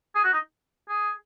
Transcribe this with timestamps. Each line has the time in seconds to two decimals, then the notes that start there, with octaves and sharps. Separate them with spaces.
0.15 G#4
0.24 F#4
0.33 D#4
0.89 G#4